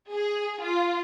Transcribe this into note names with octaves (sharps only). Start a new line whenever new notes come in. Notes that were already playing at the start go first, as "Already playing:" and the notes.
G#4
F4